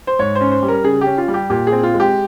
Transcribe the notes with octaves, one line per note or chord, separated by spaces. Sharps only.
C5
G#2 C#5
C5
C#4
C5
G3
A#4
C#3 G#4
C#4 G4
F4
G3
G4
A#2 G4
G#4
C4
F4
G#3
G4